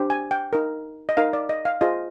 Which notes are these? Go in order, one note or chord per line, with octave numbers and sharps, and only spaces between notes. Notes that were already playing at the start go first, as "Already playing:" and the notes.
Already playing: D4 G4 C5
G#5
G5
D#4 A#4
D#5
D#4 A#4 F5
D5
D#5
F5
F4 G#4 C5 D#5